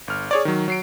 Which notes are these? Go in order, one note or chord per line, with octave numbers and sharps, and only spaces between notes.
G1 F6
G#4 C#5 D5
D#3 F#3
F#3 C7 D7